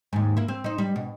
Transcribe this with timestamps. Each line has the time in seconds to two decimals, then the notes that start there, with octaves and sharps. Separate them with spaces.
0.13 D#2 G#2
0.37 A#3 E4
0.48 C4
0.64 D#4 C5
0.78 G3
0.96 B2